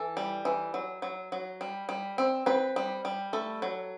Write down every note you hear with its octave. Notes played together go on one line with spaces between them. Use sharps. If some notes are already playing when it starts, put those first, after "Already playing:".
Already playing: E3 A4
G3
E3
F#3
F#3
F#3
G3
G3
C4
C4 B4
G3
G3
A3 A4
F#3